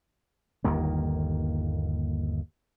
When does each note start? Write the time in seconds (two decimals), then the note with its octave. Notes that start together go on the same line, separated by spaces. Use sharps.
0.64 G1 D#2 D#3 A#3